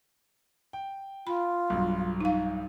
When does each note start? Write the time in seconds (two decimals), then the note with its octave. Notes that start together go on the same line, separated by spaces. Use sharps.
0.73 G5
1.27 F4 B5
1.70 B1 G2
2.20 D#4 F5